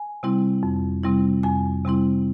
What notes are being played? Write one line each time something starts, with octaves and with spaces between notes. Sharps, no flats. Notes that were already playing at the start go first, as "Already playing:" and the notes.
Already playing: G#5
C3 G3 C4 E4
F2
C3 G3 C4 E4
F2 G#5
C3 G3 C4 E4